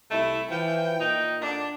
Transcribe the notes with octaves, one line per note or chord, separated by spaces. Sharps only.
C2 A3 E4
E3 F3 G5
A#2 D#4
D3 D4